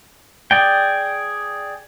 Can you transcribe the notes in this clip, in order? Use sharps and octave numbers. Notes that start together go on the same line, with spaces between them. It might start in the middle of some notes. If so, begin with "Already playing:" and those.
G#4 D5 G5